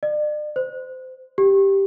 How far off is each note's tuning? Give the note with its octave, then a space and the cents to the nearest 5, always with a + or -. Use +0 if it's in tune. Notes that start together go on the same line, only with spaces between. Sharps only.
D5 +40
C5 -25
G4 +0